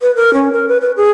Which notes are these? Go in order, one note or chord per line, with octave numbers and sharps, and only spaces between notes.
B4
A#4
C#4
A#4
B4
B4
G#4